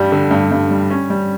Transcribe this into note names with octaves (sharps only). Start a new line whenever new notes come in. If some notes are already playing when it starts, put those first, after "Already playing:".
Already playing: G2 G3
D3
G2
G2
G3
C#4
G3